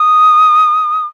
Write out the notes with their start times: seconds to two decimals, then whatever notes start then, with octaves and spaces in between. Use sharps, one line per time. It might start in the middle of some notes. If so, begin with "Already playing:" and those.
Already playing: D#6